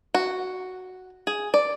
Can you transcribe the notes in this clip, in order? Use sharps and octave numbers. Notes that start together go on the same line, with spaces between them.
F#4
G#4
D5